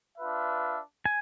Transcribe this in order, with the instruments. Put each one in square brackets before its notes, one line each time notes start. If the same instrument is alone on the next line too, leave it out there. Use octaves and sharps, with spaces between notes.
[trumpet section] D4 F4 B4 E5
[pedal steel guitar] G#5